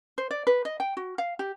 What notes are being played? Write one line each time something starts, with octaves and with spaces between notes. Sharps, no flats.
C5
D5
B4
D#5
G5
F#4
F5
G4